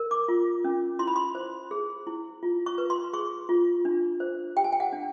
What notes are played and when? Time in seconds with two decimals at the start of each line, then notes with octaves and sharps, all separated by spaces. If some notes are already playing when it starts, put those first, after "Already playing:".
Already playing: A#4
0.11 D6
0.28 F4
0.64 C#4
0.99 E4 C6
1.07 B5
1.16 C6
1.35 C5
1.71 G#4
2.07 E4
2.43 F4
2.66 C#6
2.78 B4
2.90 C6
3.13 G#4 C#6
3.49 F4
3.85 D4
4.20 C5
4.56 G4 G5
4.64 G#5
4.72 G5
4.80 F#5
4.93 D4